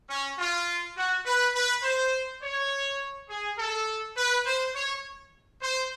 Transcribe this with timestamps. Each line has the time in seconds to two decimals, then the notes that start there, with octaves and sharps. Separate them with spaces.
0.09 C#4
0.38 F4
0.96 F#4
1.25 B4
1.54 B4
1.83 C5
2.41 C#5
3.29 G#4
3.58 A4
4.16 B4
4.45 C5
4.74 C#5
5.61 C5